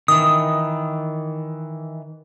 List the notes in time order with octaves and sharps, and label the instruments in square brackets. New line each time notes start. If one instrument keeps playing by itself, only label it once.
[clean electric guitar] D#3 E3 [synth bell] D#6